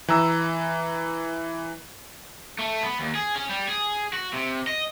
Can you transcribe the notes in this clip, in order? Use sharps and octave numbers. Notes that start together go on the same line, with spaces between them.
E3 A#5 E6
A3
B3
D#2
G#4
C#4
G3
G#4
F#4
C3
D#5